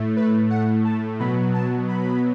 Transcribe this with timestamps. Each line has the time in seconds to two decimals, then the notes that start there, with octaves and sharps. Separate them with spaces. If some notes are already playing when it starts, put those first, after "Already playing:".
Already playing: A2 A3
0.16 B4
0.50 F#5
0.84 A5
1.19 B2 F#3 B3 B5
1.54 A5
1.88 B5